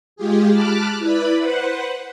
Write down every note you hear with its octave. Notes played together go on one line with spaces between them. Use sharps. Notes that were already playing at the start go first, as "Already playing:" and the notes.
G#3 F4 G4 G#4
A5 B5 D6 F6 F#6
E4 B4 D5 B5
B4 C5 F#5